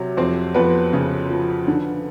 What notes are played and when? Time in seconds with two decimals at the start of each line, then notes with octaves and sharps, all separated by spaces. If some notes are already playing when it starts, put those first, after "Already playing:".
Already playing: C3 F#3
0.17 F2 C4 C5
0.54 F2 B3 B4
0.93 C#3
1.30 F3
1.68 D3